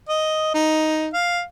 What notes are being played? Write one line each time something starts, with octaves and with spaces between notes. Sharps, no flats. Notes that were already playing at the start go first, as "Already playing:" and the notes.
D#5
D#4
F5